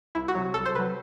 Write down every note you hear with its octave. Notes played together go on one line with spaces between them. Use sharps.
C2 E4
F#4
C3 F#3
C2 A4
C5
C3 F#3 B4